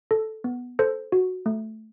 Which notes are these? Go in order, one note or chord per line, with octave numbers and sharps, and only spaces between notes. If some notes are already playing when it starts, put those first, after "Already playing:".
A4
B3
A4 C5
F#4
A3